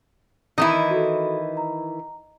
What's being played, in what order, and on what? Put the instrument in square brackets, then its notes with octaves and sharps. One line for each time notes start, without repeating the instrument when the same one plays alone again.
[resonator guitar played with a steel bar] D#3 E3 E4 [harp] D#5
[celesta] F#4 A4
A#5